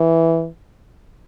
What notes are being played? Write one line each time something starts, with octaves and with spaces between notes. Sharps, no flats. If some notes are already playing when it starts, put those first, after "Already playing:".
Already playing: E3